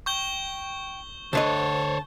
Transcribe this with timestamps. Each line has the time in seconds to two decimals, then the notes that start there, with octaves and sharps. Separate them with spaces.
0.06 G5 C#6 G6 G7
1.33 D2 D3 C5 C#5 D#5 A5